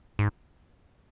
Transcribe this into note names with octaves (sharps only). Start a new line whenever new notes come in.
G#2